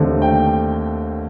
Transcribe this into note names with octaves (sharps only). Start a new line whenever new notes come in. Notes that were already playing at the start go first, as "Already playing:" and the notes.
Already playing: D#2 D3 A3 C4
G5